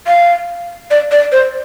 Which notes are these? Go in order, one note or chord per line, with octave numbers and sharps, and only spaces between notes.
F5
D5
D5
C5